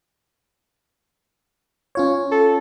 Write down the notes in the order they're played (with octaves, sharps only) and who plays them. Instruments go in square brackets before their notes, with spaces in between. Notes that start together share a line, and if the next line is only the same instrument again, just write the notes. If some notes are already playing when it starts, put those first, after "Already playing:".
[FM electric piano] C#4 F4 C#5
[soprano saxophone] A4